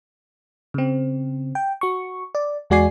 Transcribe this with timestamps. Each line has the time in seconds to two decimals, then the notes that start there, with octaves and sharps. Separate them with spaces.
0.74 C#3 C4
1.55 G5
1.81 F#4 C#6
2.35 D5
2.70 E2 G#3 F#4 D5 G#5 C7